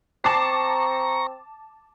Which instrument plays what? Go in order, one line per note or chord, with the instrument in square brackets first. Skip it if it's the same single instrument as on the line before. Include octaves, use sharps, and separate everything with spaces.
[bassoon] C4 [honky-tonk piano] A5 D6 C7 [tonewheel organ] A#5 C#6